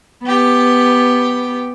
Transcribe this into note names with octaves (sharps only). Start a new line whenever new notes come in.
B3 G4